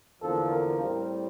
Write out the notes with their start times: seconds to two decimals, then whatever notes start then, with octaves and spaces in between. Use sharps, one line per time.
0.22 E2 D3 F3 A#3 A4
0.51 A#4
0.80 A2 G3 C4